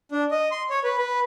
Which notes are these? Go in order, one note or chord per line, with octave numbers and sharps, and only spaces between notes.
D4
D#5
C6
C#5
B4
B4